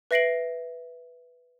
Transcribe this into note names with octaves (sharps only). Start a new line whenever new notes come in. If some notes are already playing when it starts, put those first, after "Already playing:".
B4 E5 A#6 C7 D7 F#7